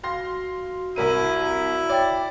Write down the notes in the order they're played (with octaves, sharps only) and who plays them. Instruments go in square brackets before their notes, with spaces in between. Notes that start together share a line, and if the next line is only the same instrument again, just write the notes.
[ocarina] F#4 [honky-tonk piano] F5 C6 A#6
[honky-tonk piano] C2 A#4 D#7 [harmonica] E4
[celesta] C#5 G5 A6 [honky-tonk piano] D5